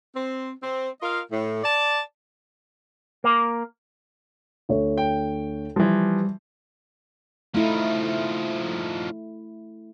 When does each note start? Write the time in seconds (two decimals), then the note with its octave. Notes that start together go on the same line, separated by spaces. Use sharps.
0.16 C4
0.63 C4
1.02 F4 A#4 D#5 F5
1.32 A2
1.63 D5 A5
3.24 A#3
4.69 D2 C#5
4.98 G5
5.76 E3 F3 G3
7.55 F3 A3 D#4 E4